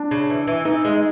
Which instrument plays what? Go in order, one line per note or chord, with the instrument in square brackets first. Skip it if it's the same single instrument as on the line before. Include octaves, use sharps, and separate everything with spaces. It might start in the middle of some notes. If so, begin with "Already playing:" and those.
Already playing: [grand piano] D4
[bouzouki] C#3
E3
E3
[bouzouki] E3 [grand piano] D#4
[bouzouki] G#3